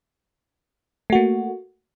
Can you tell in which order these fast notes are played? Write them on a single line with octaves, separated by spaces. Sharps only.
A3 F#4 A#3